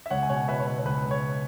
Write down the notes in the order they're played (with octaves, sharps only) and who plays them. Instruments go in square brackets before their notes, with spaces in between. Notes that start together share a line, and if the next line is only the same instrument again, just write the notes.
[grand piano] E5
C#2 C#5 F#5
G#5
B2 C#5 F#5
B2 B4 E5
C#5
B2 B4
C#5
C#2 B4
C#2
C#5